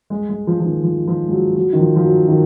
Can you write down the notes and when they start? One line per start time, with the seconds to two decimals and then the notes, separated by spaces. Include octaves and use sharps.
0.10 G#3
0.29 G#3
0.47 F3
0.60 F3
0.66 D#3
0.83 F3
1.08 F3
1.27 G#3
1.32 F#3
1.56 F#3
1.73 D#3
1.80 F3
1.96 F3
2.05 F#3
2.28 D#3